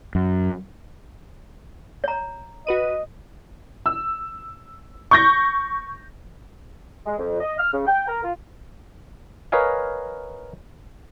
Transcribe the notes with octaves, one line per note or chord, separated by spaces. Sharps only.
F#2
C#5 A#5
F#4 B4 D#5 D#7
E6
C#6 G6 A#6
G#3
F2
D#5
F6
C#3
G5
A#4
F4
A#4 B4 C#5 D#5 F5 G#5